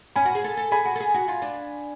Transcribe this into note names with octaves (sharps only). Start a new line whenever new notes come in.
C#4 G#5 B5
F#4
G#4
A4
A4
G#4 G#5 B5
F#4
A4
G#4
F#4
F4
D4